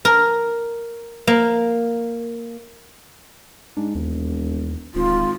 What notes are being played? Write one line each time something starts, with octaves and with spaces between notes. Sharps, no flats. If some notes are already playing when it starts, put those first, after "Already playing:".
A#4
A#3
G#2 D4
E1 D#2
D1 G#1 F4